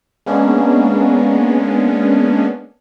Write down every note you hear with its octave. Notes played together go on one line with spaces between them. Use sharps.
G#3 A#3 B3 C#4 D4